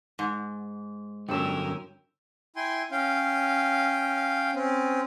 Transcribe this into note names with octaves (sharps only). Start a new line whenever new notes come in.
G#2
G2 D3 F#3 C#4 A#4 G5 E6
E4 G5 G#5 C6
C#4 F5 G5
C4 C#4